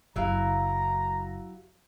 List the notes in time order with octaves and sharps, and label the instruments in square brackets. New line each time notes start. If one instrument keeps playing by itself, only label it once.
[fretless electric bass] F#1 [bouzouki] F#3 E4 F5 [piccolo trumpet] A#5